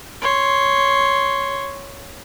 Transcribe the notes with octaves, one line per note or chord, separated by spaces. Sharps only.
C#5 C6